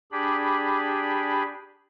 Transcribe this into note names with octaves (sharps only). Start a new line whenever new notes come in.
D4 G4 G#4 B5